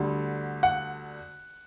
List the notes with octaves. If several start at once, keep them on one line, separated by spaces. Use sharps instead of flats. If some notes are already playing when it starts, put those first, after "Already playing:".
Already playing: D2 D3 G3
F#5